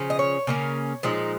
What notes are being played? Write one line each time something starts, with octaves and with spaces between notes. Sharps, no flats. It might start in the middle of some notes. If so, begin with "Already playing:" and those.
Already playing: C#3 F3 C#4
D#5
C#5
C#3 A#3 C#4
A#2 F3 G#3 D#4